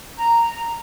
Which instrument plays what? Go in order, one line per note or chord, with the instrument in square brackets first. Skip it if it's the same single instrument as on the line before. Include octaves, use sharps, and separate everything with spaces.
[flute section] A#5